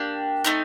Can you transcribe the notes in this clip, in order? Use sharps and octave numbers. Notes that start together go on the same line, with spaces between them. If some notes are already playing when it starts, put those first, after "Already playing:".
Already playing: A#3 D4 G4
A3 C4 D#4